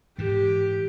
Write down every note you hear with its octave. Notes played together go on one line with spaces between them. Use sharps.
G#2 E3 G4